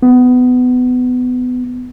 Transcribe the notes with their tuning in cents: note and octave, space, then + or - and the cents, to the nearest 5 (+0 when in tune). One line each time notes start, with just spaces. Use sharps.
B3 +20